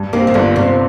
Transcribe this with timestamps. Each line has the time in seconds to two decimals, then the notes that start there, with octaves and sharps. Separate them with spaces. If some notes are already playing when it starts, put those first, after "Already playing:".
Already playing: G2
0.13 C3 D#3 A#3
0.27 D#3
0.34 G1 D3
0.56 G1 C3